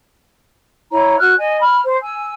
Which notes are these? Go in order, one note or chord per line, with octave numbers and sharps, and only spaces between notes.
E4 C#5 A#5
F#4 F6 F#6
D#5 G#5
B5 F6
C5
G#5 E6